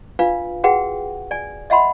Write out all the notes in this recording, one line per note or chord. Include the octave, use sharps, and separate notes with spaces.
D4 F4 B4 F5
F#4 G#4 B4 F#5 G5
D5 G#5
D#5 E5 F#5 B5 C6